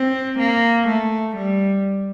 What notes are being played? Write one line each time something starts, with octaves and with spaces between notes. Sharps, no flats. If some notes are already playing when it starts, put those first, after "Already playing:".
Already playing: C4
A#3
A3
G3